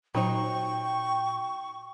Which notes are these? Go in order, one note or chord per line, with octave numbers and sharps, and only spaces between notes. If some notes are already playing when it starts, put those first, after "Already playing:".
A#2 F#3 D#4 C5 G5 C#6